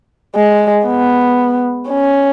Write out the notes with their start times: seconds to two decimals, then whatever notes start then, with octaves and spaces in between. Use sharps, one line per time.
0.35 G#3
0.86 B3
1.89 C#4